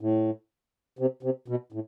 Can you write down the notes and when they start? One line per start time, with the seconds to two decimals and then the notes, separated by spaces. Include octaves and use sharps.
0.01 A2
0.99 C3
1.23 C3
1.48 B2
1.72 A2